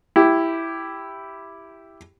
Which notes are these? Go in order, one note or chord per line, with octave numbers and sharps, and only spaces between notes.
E4 G4